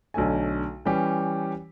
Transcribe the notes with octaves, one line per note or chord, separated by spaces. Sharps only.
B1 D3 A3 G#5
E3 G3 C#4 G4